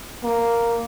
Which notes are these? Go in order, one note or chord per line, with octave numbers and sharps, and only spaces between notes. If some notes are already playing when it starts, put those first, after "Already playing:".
A#3